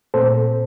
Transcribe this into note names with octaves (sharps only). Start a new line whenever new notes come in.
A#2 A3 C4 A4 C5